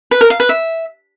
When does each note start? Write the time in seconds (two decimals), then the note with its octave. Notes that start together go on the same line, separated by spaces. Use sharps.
0.11 B4
0.21 A#4
0.30 F5
0.40 B4
0.49 E5